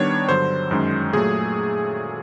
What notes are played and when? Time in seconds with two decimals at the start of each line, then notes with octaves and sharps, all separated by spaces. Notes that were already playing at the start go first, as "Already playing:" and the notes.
Already playing: D#3 G3 B3 D4 C#5
0.29 G2 D3 F#3 C5
0.71 F#2 D#3 G#3 C#4
1.13 A#2 F#3 A3 G#4